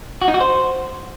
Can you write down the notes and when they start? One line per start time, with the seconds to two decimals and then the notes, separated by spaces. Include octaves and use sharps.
0.22 F#4
0.28 D#4
0.34 F#4
0.41 C5